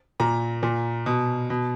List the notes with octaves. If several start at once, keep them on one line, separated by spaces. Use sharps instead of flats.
A#2 A#5
A#2
B2
B2